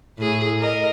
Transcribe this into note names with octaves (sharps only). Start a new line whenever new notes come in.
A2 G#4
A#4 D#5